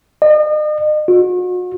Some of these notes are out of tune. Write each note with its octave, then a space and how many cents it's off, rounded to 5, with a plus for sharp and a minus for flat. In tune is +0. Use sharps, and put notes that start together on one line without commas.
D#5 -40
F#4 -40